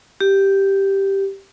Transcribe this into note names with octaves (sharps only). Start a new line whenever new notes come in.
G4